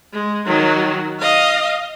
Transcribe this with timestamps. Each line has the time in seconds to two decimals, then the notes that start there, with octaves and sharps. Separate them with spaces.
0.13 G#3
0.46 D#3 F#3
1.19 D#5 F5